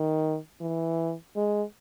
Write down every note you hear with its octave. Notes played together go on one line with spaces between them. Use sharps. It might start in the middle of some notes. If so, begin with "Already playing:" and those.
Already playing: D#3
E3
G#3